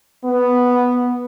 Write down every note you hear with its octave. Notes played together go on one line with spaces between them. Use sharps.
B3